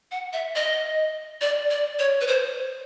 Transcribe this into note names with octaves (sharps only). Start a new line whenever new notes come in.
F#5
E5
D#5
D5
D5
C#5
B4
C5